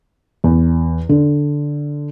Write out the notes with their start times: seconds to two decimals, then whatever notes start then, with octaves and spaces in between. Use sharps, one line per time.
0.44 E2
1.09 D3